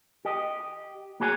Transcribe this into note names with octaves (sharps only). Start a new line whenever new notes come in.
G4 D#5
A#3 F#4 G#4 C#5 G5 G#5